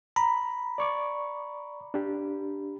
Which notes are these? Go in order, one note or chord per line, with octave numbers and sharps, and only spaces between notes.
A#5 B5
D5 C#6 D6
D4 G4